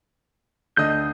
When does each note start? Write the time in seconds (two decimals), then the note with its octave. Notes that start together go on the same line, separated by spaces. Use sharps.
0.77 D2 D3 D#5 D#6 G6